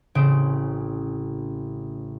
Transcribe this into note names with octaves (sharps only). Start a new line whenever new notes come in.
A1 C#3 C4 D7